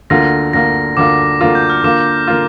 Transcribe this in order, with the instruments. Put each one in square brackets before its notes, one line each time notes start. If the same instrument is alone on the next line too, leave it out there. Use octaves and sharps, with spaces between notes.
[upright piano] D2 D3 A#3 F4 [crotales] A#6
[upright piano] D2 D3 A#3 F4 [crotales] A#6
[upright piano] D2 D3 A#3 F4 [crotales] D6
[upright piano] D2 D3 A#3 F4
[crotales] G6
F6
[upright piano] D3 A#3 F4 [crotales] D6
[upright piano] D3 A#3 F4